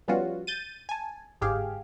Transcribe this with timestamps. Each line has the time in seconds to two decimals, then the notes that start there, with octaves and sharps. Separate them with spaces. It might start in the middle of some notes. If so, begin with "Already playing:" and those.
0.08 F3 G3 B3 C#4 F4 F#4
0.47 G6 A6 D#7
0.89 G#5 A5
1.41 G1 G#2 G4 G#4 F5